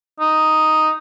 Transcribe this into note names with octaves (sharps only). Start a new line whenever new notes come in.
D#4